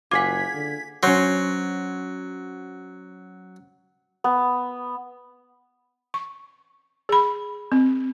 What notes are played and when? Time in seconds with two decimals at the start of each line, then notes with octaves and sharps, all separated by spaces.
0.11 F#1 F4 G#4 F#5 D6 G#6 B6
0.54 D3
1.03 F#3 C#4 C5
4.24 B3
6.14 C#6
7.09 G#4 B5
7.72 C4